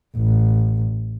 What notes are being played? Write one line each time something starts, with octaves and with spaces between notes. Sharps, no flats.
A1